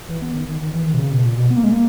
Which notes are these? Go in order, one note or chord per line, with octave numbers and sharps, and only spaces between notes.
E3
B3
D#3
D#3
D#3
E3
D#3
B2
C#3
B2
A#2
B2
B3
A#3
G#3
A#3